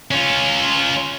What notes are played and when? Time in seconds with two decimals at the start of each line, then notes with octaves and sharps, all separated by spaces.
0.12 C#4 F4